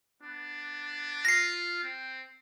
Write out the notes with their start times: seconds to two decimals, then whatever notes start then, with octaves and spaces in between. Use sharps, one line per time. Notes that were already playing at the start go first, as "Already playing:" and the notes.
0.22 B3 D4
1.25 F4 A#6 C7
1.82 C4